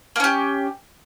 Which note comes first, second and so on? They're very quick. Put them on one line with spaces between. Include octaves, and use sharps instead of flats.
A#3 C#4 G4